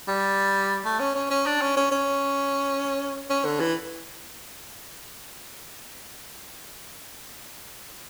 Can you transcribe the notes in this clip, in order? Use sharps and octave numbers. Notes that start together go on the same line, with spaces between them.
G3
A3
C#4
C#4
C#4
D4
C#4
C#4
C#4
C#4
D3
E3